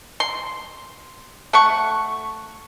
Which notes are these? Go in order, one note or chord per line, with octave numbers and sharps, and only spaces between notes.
C6
A3 F#5 C#6